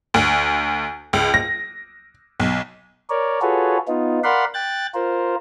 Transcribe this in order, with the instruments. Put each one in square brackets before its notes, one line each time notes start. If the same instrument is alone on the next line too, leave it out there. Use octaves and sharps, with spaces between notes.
[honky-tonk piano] D2
C#2
A#6
B1
[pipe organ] A#4 C#5 D5
F4 F#4 G#4 A4 B4 C#5
B3 D#4 F4
A#4 D5 F5 F#5 B5 C6
G5 F#6 A6
F4 A#4 C5